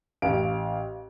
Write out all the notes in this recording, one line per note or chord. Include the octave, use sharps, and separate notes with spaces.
A1 F5 D7